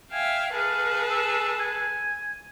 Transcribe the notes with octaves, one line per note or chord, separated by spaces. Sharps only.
E5 F5 G5 G#5
G#4 A4 B4 F5
E6
G#5